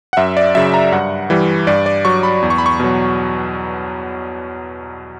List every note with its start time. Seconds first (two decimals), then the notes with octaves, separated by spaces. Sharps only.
0.13 F#5
0.17 F#2 E5
0.37 D5
0.55 C#3 F#3 E5
0.74 A#5
0.92 G2 F#5
1.30 E3 G3
1.67 G2 D5
1.86 D5
2.05 F#3 C#6
2.23 B5
2.42 E2
2.50 C#6
2.58 B5
2.66 C#6
2.80 B2 F#3